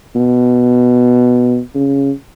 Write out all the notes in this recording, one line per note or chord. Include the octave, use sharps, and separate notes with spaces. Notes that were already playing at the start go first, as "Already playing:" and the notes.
B2
C#3